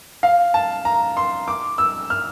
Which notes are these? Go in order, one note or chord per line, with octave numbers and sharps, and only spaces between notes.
F5
A5
A#5
C6
D6
E6
F6